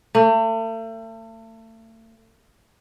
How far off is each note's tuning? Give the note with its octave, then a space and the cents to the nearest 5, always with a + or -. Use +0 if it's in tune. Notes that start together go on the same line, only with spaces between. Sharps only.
A3 +40